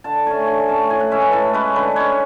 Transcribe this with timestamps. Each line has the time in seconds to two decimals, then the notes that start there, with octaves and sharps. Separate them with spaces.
0.04 D3 A5
0.26 A3 C#4 G#5
0.47 D3 G#5
0.68 A3 C#4 A5
0.90 A2 G#5
1.00 F#5
1.12 G#3 C#4 E5
1.21 B4
1.32 A2 A4
1.53 G#3 C#4 B4
1.76 D3 B4
1.96 G#3 C#4 C#5